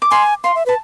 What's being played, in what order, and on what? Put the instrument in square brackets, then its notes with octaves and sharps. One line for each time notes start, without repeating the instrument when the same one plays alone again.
[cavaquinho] D6
[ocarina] G#5 [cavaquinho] C6
[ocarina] F5 [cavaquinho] C6
[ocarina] E5
[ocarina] B4 [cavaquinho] A5